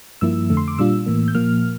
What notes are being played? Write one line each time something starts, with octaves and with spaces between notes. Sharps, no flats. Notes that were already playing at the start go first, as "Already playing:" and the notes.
G2 F3 A#3 E4 E6
F2 D3 A3
C6
D6
A#2 G3 D4 F4 E6
A2 E3 A#3
G6
A#2 F3 A#3 F6